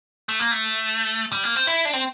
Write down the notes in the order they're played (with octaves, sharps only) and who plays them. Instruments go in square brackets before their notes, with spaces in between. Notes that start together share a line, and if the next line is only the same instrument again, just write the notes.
[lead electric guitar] A3
A#3
A3
G3
A#3
C4
E4
D4
C4